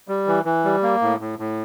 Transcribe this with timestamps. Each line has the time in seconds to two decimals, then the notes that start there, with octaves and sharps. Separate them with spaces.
0.08 G3
0.27 E3
0.45 E3
0.65 G3
0.83 A#3
1.01 A2
1.20 A2
1.39 A2